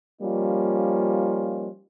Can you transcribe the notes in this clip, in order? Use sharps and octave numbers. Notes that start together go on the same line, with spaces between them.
F3 G3 A#3 C#4 D#4 F4